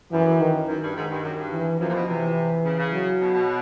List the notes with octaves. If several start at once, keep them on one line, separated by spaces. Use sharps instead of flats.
F#2 E3
D#3
F#2
G2
G#2 D#3
G2
F#2
G2
E3
F#2 F3
A#2
B2
C3 E3
C#3
C#3
F#3
B2
B2